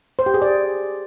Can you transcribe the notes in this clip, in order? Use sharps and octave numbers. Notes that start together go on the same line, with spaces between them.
C5
G4
G#4
D5